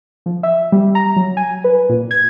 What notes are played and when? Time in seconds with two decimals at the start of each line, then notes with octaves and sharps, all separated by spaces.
0.26 F3
0.43 E5
0.72 G3
0.95 A#5
1.16 F#3
1.37 G#5
1.64 B4
1.89 A#2
2.11 G#6